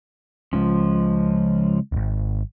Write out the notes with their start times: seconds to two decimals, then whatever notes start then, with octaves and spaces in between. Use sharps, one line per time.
0.53 C#3 F3 G#3 C#4
1.92 D#1 G#1